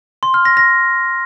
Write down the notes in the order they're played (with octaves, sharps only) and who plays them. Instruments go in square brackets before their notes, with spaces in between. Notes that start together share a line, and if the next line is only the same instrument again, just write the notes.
[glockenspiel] C6
F6
A#6
A#6